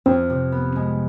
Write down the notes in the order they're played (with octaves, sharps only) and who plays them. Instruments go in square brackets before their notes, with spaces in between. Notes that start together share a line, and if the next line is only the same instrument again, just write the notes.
[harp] F2 [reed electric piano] C4
[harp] C3
B3
G#3